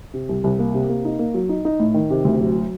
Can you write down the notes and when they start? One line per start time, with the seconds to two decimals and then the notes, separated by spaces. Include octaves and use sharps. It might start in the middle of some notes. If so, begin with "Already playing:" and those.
0.14 C3
0.29 C2
0.44 C2
0.59 A#3
0.74 C3
0.89 A#3
1.05 D#4
1.19 A#3
1.34 F#3
1.49 D#4
1.65 D#4
1.80 A2
1.94 D#3
2.10 C3
2.25 D2
2.40 F#3
2.55 F#3